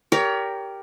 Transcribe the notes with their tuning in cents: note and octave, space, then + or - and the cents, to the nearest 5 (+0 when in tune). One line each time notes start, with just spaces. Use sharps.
G4 +0 A#4 +0 C#5 +35